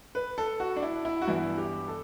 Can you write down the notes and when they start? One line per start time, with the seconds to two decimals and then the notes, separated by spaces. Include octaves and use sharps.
0.15 B4
0.38 A4
0.60 F#4
0.76 D4
0.83 E4
1.05 E4
1.22 F#4
1.27 G2 E3 B3 E4
1.58 G4
1.88 A4